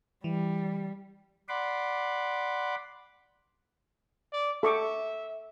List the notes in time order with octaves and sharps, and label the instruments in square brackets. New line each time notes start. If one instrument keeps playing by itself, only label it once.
[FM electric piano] E3 [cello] G3
[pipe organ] D5 F#5 B5 C6 D6
[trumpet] D5
[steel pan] A4 C#6 D6 [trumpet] E5